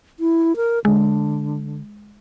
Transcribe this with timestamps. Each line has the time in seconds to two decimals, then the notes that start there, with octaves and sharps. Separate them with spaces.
0.20 E4
0.56 A#4
0.85 D3 G#3